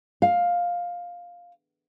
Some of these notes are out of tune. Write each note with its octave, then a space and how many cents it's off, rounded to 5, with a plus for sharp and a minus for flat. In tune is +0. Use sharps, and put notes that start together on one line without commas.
F5 +10